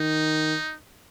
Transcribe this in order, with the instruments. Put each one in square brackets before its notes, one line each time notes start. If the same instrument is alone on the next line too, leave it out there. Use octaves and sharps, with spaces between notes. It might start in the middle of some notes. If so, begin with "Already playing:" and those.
Already playing: [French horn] D#3 [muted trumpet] D#4